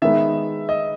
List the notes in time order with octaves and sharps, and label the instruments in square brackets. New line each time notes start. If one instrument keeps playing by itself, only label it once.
[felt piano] D#3 G#3 B3 D#4 [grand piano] E5
[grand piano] D#5